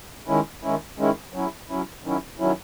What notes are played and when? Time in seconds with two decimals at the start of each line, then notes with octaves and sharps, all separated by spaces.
0.28 D#3 G#3 C#4 E4
0.63 D#3 G#3 C#4 E4
0.99 D#3 G#3 C#4 E4
1.33 F#3 C#4 E4
1.69 F#3 C#4 E4
2.04 D#3 F#3 C#4 E4
2.39 D#3 F#3 C#4 E4